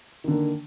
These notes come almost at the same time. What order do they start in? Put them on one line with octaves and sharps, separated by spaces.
D#3 D3 A#3